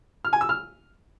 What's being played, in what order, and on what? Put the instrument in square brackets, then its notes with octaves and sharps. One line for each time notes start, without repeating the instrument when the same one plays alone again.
[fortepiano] F6
G#5
E6
F6